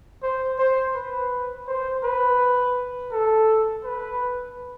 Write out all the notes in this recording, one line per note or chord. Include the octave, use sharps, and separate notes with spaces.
C5
C5
B4
C5
B4
A4
B4